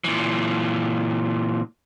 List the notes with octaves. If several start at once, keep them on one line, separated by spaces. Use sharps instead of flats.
A#2 E3